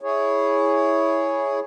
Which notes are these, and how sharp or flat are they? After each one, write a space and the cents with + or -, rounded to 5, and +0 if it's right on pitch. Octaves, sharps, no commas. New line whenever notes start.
E4 -10 G#4 +0 C#5 +0